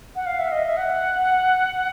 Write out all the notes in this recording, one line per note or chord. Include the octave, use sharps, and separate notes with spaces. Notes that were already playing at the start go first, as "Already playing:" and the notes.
F#5
F5
E5
D#5
E5
F#5